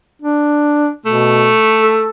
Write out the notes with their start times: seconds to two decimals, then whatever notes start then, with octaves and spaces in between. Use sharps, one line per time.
0.22 D4
1.06 B2 A3
1.82 A4